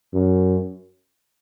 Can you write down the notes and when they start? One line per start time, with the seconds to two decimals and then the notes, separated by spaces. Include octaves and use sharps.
0.14 F#2